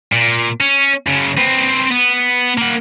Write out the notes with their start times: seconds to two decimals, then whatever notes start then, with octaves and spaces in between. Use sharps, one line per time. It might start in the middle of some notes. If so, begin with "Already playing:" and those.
0.13 A#2
0.61 C#4
1.07 F#2 C#3
1.37 C4 B4
1.91 B3
2.58 A#3 F#5